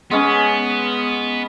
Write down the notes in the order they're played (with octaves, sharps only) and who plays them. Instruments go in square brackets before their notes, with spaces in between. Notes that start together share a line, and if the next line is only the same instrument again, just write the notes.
[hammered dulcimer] G#3 C#4 [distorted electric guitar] B3